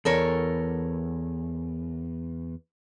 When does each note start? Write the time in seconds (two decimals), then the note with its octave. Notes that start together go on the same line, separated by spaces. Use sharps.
0.05 E2 A4 A#4 C#5